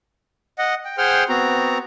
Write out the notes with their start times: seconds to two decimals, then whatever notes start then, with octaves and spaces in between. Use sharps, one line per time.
0.58 D#5 F#5
0.85 G5
0.98 G#4 C5 F#5 G5 C6 F6
1.29 B3 C4 F#4 A#5